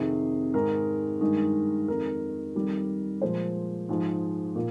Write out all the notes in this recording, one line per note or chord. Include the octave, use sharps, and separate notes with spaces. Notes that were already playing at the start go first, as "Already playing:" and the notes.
Already playing: F2 C3 D#3 G#4
G#2 D#3 G#3 A#4
G2 D#3 G#3
F2 D#3 G#3 A#4
F2 D#3 G3
A#2 F3 G#3 C5
G#2 F3 G#3
A#2